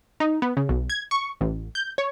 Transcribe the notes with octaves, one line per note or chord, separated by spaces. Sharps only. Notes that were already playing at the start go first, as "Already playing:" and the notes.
D#4
B3
C#3
B1
G#6
C#6
A1
G6
C#5